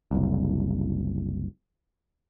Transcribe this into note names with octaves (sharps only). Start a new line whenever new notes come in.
F#1 C2